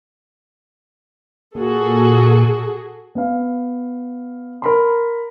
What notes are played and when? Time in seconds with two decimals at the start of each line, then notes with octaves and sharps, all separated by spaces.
1.55 A#2 F#4 G#4 A4
3.15 B3 F5
4.62 A#4 B5 C6